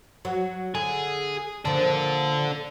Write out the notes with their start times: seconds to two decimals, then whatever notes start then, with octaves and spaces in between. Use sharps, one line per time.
0.25 F#3
0.75 D3 G#4
1.65 A#2 F3 D4 A4